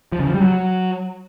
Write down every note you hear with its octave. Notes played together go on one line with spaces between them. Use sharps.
F3
C#3
F3
G3
F#3